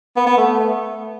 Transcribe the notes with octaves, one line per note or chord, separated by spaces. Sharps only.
B3
B3
A3